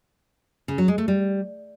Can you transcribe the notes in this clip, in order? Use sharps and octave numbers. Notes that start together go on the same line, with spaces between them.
C#3
F#3
G#3
A3
G3